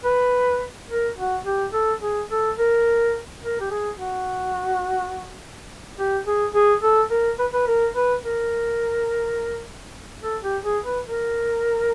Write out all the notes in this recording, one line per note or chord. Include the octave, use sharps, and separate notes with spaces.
B4
A#4
F#4
G4
A4
G#4
A4
A#4
A#4
G4
G#4
F#4
G4
G#4
G#4
A4
A#4
B4
B4
A#4
B4
A#4
A4
G4
G#4
B4
A#4